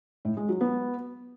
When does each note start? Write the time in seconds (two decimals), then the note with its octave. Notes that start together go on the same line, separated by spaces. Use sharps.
0.25 A2
0.37 G#3
0.49 F#3
0.61 B3